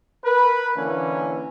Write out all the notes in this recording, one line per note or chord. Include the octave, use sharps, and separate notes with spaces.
A#4 B4
D3 E3 A#3 C#4